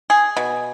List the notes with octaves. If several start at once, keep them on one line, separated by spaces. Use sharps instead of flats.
G#4
B2